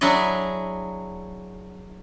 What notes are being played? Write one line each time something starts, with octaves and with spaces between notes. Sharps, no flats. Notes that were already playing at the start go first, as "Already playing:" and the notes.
F#3 D4 E4 G#4 D#5